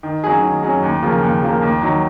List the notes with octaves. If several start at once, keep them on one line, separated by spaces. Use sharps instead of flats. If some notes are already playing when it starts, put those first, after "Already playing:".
D#3
F#3 C#4 G#4
D#3
F#3 C#4 G#4
D#2
C#3 F3 A#3
D#2
C#3 F3 A#3
D#2
D#3 F#3